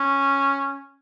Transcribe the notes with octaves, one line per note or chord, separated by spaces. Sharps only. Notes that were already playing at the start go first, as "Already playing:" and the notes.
Already playing: C#4